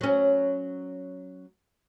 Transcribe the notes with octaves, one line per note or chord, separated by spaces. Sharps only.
F#3 C#4